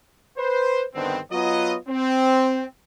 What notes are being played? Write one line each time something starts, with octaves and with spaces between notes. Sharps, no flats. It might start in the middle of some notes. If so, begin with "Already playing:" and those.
B4 C5
G2 D3 D#3 B3 C4
F#3 B3 F4 D#5
C4